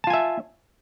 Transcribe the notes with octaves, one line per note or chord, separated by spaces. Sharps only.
F4 E5 G#5 A5